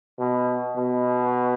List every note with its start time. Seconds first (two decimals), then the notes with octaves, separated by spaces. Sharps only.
0.19 B2
0.76 B2